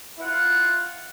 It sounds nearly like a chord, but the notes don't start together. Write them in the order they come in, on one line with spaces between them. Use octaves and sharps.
E4 F#5 F4